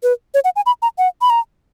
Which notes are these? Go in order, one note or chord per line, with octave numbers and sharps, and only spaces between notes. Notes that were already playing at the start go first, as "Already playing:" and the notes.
B4
C#5
F#5
G#5
B5
A#5
F#5
B5
A#5